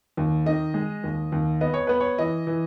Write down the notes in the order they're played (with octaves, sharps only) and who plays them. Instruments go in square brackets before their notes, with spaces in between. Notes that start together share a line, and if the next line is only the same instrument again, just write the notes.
[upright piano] D#2
D#3 D#5
G#3
D#2
D#2
B3 D#5
C#5
B3 B4
C#5
E3 D#5
E3